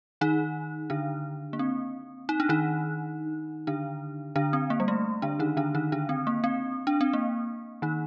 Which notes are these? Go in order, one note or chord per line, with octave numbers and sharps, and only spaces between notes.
D#3 D#4
D3 D4
A#3
C4
D#4
D4
D#3 D#4
D3 D4
D3 D4
C4
A#3
G3
A3
D3 D4
D#3 D#4
D3 D4
D#3 D#4
D3 D4
C4
A#3
C4
D4
C4
A#3
D#3 D#4